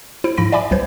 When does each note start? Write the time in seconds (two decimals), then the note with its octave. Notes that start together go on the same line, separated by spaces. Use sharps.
0.24 E4 C5 D7
0.37 G#2 F3 B5 A#6 D7
0.52 D5 E5 G#5 B5 D6
0.71 C2 F#3 B4 C5 G#6